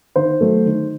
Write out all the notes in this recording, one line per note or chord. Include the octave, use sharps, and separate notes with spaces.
D#3 C5
F#3 A3
D#3